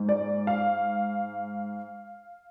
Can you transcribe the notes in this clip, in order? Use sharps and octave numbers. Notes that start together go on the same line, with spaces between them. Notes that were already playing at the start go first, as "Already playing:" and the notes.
Already playing: G#2
D5
F5